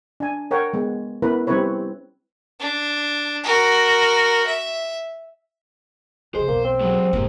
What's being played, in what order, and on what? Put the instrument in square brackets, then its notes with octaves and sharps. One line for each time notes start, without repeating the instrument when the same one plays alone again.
[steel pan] D4 G#5
A#4 C#5 F#5 G5
G#3 B3
B3 C#4 E4 A#4 B4
G3 C4 C#4 E4 B4 C#5
[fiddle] D4
F#4 A#4
E5
[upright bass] F2 C#3 [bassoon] G#3 [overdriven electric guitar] C5
[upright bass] B1 E2 [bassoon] A#3
[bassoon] C4
[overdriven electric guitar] F#3 G#3
[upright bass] F1 G#2 [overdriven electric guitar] D#2 A#3